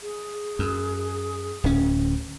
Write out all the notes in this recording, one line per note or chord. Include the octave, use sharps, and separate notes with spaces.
G#4
F#2
D1 C#4